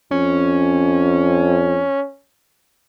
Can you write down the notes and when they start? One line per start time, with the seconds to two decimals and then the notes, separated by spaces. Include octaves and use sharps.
0.11 F2 C#4